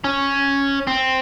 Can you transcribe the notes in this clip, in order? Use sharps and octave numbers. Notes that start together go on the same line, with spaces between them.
C#4
C4